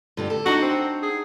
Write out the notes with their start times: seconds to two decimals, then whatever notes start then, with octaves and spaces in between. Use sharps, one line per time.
0.17 G2 D3 G4
0.30 A4
0.46 D4 D#4 F#4 F#5
0.62 C4
1.03 G#4